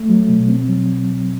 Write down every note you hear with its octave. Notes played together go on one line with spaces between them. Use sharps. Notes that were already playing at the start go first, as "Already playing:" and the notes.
Already playing: A3
F#3
B2
C4
F#3